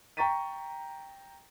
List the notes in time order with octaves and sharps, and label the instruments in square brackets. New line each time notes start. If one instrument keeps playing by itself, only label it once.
[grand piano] G5 A#5 C#6 A6 B6 D#7